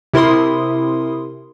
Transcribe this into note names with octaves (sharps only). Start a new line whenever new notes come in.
C3 E4 A#4 C6 D#6